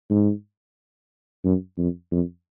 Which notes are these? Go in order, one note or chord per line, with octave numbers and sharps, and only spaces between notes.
G#2
F#2
F2
F2